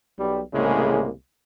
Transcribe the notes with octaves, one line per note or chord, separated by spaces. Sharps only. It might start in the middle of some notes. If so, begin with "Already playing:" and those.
B1 G3
C2 A2 C#3 G#3 A#3